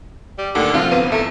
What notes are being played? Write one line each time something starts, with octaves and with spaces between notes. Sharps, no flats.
G3
D#2 A#2 D3
C3 F3 C4 F4
G1 B3 D#7
E2 A3